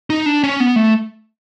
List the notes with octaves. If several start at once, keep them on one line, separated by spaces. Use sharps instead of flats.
D#4
D4
C#4
B3
A3